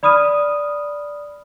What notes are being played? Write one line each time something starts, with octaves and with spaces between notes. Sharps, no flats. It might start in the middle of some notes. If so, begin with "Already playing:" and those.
D5 B5 D#6 F6 D#7